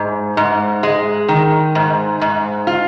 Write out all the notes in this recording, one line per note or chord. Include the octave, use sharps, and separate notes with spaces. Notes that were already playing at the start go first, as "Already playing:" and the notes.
Already playing: G#2
G#2
G#3
D#3
G#2
G#2
F4